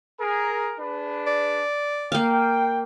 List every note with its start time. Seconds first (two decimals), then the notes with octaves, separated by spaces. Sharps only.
0.20 G#4 A#4
0.79 D4 G#4 B4
1.27 D5
2.12 A#3 F5 G5